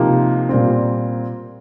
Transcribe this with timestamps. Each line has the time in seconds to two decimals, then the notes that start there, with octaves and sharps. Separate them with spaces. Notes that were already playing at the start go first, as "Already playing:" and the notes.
Already playing: C3 F3 A#3 D#4
0.49 A#2 G3 C4